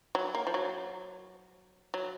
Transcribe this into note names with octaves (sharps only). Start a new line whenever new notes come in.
F#3
A#3
F3
F#3
F#3